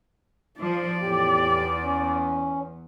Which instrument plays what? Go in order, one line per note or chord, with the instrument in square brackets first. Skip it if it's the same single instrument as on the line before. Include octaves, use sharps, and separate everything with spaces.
[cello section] F3 [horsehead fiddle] D5
[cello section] E2 [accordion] A2 G4
[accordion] C#4